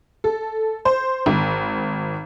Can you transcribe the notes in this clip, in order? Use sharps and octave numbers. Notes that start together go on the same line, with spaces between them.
A4
C5
G#1